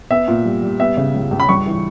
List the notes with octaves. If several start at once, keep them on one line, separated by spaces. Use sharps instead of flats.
B3 E5
A#2
G3
G3
B3 E5
C#3
C#2
C#2
B5
G2 C#6
E3